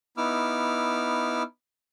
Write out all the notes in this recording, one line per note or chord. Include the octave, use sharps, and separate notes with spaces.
B3 D#4 E4 D6 E6 F6